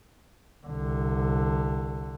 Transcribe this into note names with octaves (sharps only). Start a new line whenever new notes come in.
C2 D3